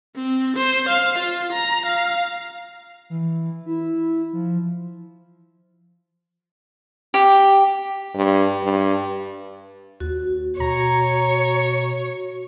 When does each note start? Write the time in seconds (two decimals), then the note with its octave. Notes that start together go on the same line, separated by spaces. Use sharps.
0.16 C4
0.57 C5
0.89 F5
1.18 F4
1.53 A#5
1.86 F5
3.10 E3
3.66 E4
4.33 F3
7.14 G4
8.15 G2
8.63 G2
10.00 D#2 F#4
10.60 B2 C#5 A#5